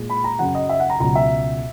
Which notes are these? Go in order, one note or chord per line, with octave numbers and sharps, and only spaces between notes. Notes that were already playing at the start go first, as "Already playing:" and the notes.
Already playing: A#2 G#3
B5
A#5
F#2 C#3 F#3 F#5
D#5
E5
F#5
A#5
C#2 B2 F#3 A#5
E5